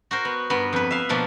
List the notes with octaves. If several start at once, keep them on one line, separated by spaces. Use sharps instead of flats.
F#4 A#4 C5
B3
G2 B3 A#4
F2 B4
E5 F5
B2 F3 A#3 D4